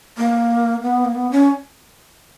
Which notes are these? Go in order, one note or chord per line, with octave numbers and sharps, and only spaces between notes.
A#3
B3
A#3
B3
C#4